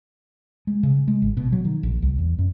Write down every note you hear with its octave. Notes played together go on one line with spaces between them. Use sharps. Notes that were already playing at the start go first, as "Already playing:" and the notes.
G#3
C#3
G#3
G#1
B2
F#3
D#3
A#1
C2
E2
F#2